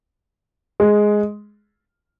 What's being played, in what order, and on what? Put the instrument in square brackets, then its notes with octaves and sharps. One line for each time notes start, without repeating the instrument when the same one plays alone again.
[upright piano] G#3